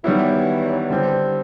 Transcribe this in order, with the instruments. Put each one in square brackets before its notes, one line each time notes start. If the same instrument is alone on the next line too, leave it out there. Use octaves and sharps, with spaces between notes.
[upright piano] D#3 G3 B3 E4 [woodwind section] E3 F#3
[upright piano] D3 G3 C4